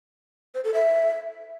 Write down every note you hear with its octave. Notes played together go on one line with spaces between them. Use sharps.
C5
A4
E5